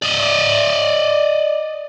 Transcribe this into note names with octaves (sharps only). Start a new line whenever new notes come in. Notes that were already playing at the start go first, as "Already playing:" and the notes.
D5 D#5